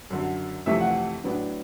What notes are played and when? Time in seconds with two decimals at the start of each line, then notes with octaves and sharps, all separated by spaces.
0.10 F#2 D3 F#3
0.66 F2 C3 E3 A3 E5
0.80 F#5
1.24 A2 F#3 B3 D4